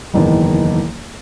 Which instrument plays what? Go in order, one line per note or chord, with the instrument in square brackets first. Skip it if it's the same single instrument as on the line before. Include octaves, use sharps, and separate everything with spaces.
[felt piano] F#1 E2 D#3